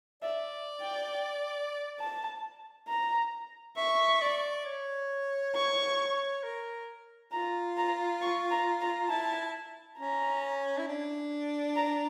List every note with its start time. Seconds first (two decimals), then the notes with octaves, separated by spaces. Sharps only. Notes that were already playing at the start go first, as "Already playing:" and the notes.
0.22 D5 E5
0.82 G5
2.00 A5
2.88 A#5
3.77 E5 C#6
4.22 D5
4.65 C#5
5.55 C#6
6.43 A#4
7.32 F4 A#5
7.77 A#5
8.21 C#6
8.50 A#5
8.81 A#5
9.09 E4 A5
9.98 C#4 A#5
10.78 E4
10.88 D4
11.76 A#5